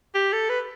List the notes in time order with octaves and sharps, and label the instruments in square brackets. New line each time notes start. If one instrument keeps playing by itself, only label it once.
[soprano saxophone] G4
A4
B4